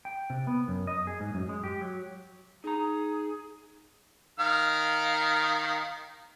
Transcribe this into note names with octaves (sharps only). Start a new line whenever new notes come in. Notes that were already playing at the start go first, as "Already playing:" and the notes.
G5
C3
B3
F#2
D#5
G#4
G#2
F#2
G#3
G4
F#3
D#4 G#4 A#5
D#3 F5 F6